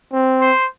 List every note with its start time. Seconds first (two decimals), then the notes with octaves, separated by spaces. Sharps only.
0.12 C4
0.41 C5